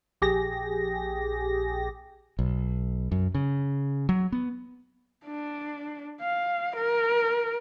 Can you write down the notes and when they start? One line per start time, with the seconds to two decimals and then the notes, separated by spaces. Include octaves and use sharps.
0.22 A#1 G4 G#4 A#6
2.39 B1
3.12 F#2
3.35 C#3
4.09 F#3
4.32 B3
5.26 D4
6.21 F5
6.76 A#4